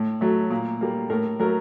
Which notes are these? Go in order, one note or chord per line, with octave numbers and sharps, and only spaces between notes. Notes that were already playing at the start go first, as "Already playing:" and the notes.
Already playing: A2
F#3 A3
A#2
G3 A#3
A2 A#4
F#3 A3 A#4